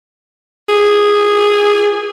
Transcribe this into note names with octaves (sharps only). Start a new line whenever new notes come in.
G#4